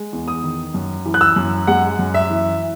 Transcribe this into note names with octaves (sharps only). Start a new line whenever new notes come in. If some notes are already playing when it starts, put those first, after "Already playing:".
Already playing: G#3
E2
D#6
D#3
F#2
E3
F#6
E6
F#2
G#3 F#5
F#2
E5
E3